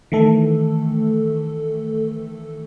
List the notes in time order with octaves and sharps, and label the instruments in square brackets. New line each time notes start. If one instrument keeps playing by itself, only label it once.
[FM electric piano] D#3 E3 A3 A4